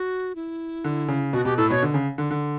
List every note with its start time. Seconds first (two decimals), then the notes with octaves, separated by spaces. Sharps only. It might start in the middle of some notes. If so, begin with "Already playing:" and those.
Already playing: F#4
0.35 E4
0.84 D3
1.08 C#3
1.33 B2 F#4
1.45 B2 G4
1.57 A2 A4
1.70 B2 C#5
1.83 D3
1.94 C#3
2.18 D3
2.31 D3